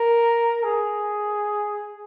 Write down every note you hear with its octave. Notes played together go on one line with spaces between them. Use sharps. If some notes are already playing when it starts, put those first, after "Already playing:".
Already playing: A#4
G#4